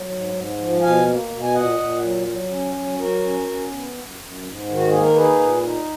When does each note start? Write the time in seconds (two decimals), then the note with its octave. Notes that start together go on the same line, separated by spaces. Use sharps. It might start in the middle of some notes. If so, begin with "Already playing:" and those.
Already playing: F#3
0.10 G#2
0.34 G#2
0.58 F3
0.82 B2 F5 G#5
1.06 A#3
1.31 B2
1.43 G#5
1.54 A#2 D#5 F#5
1.79 A#2
2.03 F#3
2.27 F#3
2.51 C#4
2.74 F#3
2.99 F#3 F#4 A#4
3.23 C#4
3.47 C#4
3.71 B3
3.95 F#2
4.19 F#2
4.43 G#2
4.68 D#3
4.75 F#4
4.88 A#3 G#4
5.02 A#4
5.15 D#4 G#4 B4
5.40 A#2
5.64 D#4